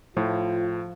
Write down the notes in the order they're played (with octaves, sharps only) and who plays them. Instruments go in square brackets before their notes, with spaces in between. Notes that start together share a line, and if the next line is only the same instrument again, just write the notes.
[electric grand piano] A2 [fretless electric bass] F3 [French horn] F4